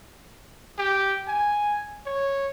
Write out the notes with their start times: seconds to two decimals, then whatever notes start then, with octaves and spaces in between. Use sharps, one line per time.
0.78 G4
1.28 G#5
2.06 C#5